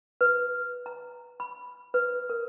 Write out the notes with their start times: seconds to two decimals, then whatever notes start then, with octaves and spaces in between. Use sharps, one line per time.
0.21 B4
0.86 A#5
1.40 B5
1.94 B4
2.30 A#4